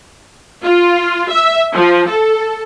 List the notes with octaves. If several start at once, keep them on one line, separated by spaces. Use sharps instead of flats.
F4
E5
F3
A4